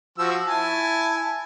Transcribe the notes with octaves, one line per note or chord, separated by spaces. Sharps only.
F3 F#4 E6
E4 G#5 A5